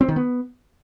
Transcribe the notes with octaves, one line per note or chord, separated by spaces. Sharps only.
C4
D#3
B3